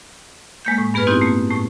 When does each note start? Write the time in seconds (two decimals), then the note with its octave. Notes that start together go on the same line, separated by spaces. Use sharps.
0.65 G#3 A#3 G6
0.78 A2
0.94 G2 B3 G#4 B4 F6
1.07 C4 D#4 E4 F#4 G4
1.21 A3 A#3
1.51 A2 A3